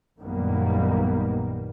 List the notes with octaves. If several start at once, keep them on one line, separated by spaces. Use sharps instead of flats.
A#1 F#2 D#3 G3 A#3 B3